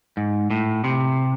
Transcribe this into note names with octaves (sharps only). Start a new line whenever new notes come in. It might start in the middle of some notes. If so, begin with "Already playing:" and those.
G#2
A2
C3